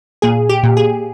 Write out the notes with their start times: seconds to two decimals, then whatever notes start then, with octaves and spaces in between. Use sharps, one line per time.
0.22 A#2 G#4
0.49 G4
0.63 A#2
0.77 G#4